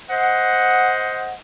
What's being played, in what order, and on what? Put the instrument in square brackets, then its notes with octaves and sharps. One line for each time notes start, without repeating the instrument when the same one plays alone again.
[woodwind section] C5 D#5 F#5